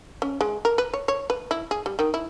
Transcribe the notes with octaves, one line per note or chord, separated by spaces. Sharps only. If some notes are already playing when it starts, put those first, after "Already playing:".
C#4
G#3
A#4
B4
C#5
C#5
B4
E4
G#4
G3
D#3
E4